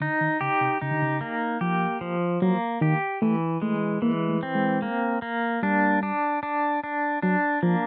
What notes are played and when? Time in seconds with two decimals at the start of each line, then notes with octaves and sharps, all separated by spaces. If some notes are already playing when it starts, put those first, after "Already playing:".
0.01 D3 D#4
0.21 D#3
0.41 C#3 G4
0.61 C3
0.81 C#3 D#4
0.91 D3
1.02 C#3
1.21 A#3
1.61 F3 G4
2.01 F3
2.42 F#3 A#3
2.81 D#3 G4
3.22 E3 A3
3.62 G#3 A3
4.02 E3 A#3
4.29 A3
4.43 C4
4.55 G#3
4.82 A#3
5.22 A#3
5.63 G3 D4
6.03 D4
6.43 D4
6.84 D4
7.22 F#3 D4
7.63 F3 A#3